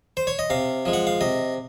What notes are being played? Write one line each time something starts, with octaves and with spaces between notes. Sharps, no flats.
C5
C#5
D#5
C3 F5
F3 G#3
F#5
F5
C3 D#5